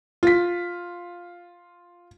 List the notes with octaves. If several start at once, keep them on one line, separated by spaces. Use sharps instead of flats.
F4 B6